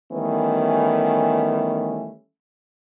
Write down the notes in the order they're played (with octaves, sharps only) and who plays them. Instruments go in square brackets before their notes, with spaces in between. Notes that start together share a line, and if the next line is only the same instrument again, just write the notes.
[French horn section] D#3 E3 G3 A3 B3 C#4